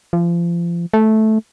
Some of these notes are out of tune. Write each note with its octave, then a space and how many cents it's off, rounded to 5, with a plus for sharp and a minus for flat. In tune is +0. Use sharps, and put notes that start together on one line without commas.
F3 -30
A3 -10